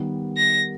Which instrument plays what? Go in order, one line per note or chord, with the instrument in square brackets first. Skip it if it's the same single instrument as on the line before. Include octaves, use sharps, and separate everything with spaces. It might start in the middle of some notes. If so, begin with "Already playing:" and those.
Already playing: [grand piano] D#3 G3 B3
[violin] A#6